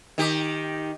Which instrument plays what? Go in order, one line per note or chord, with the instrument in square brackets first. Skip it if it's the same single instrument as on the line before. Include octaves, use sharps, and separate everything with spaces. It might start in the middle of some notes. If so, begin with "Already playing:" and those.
[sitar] D#3 G4